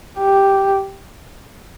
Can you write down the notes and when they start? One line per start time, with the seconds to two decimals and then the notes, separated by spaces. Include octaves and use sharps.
0.20 G4